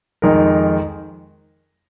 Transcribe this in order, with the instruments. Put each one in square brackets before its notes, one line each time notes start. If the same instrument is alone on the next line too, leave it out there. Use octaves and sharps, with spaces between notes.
[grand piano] F2 D#3 G#3 D#4 A#4